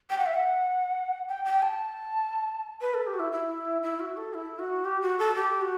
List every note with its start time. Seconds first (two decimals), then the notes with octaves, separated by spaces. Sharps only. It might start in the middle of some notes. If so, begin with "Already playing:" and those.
0.10 G5
0.18 F#5
0.26 E5
0.34 F#5
1.29 G5
1.45 G5
1.62 A5
2.81 B4
2.94 A4
3.07 G4
3.14 F#4
3.19 E4
3.32 E4
3.83 E4
4.00 F#4
4.17 A4
4.34 E4
4.59 F#4
4.85 G4
5.02 F#4
5.19 A4
5.36 G4
5.61 F#4